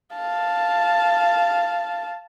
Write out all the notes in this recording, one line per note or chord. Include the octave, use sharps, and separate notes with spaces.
F5 A5